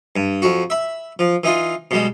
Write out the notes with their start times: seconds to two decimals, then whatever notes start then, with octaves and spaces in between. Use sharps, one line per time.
0.16 G2
0.42 F2 F#4
0.70 E5 B5
1.19 F3
1.43 E3 D#4 F4
1.91 B2 G3 G#3